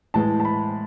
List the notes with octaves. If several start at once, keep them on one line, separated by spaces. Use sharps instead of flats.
A2 E3 G#3 A5
A5
B5